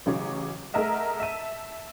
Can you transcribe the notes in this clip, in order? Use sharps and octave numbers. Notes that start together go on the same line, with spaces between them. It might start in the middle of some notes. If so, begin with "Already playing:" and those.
A1 C#3 F#3 C#4 D6
A3 G#4 A#4 D#5 E5 F#5
E5 A5 D#7